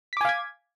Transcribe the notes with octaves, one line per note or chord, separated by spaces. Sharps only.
F5 G#5 D6 G#6 B6